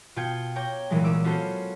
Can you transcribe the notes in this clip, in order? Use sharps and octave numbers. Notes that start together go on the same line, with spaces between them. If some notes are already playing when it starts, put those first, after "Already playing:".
B2 F4 G5 G#6 C#7
C#5 G5 A#5 D6
C2 A#2 E3 F#3 G#3
C#4 D6 E6
B3 C#4 F4 F#4 A4 C5